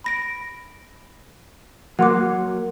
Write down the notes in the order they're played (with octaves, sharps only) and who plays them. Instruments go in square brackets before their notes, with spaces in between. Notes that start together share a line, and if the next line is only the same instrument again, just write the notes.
[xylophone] B5 A#6 D7
[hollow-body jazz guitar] F#3 A#3 [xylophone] F#5 C6 D6